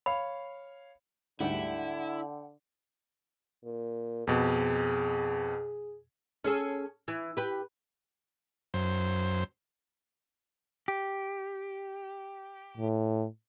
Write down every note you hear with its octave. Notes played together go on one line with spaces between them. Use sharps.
C#5 F5 B5
D2 G#2 D3 G3 E4 F#5 G5
A#2
F2 B2 G#4
C#4 G#4 A4
E3
G4 B4
F#2 C5
G4
A2